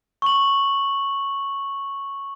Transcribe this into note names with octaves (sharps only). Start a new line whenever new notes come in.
C#6 F#7